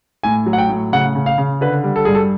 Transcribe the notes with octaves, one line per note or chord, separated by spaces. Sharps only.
A2 G#5
F#3
F#5
G5
A2
C#3 F#5
C#3
F5
C#3
D3 B4
G3
A4
G2 G#4
A4